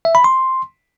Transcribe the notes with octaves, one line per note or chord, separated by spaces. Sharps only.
E5
B5
C6